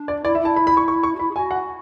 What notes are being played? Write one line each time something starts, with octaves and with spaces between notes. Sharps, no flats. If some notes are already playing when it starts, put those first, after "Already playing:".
Already playing: D4
D5
E4 D5
E5
E4
A5
B5
B5
C#6
C#6
C#6
F#4
E4 B5
G#4
F#4 G#5
F#5